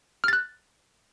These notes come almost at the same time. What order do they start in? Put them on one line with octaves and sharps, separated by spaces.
F6 A6 F#6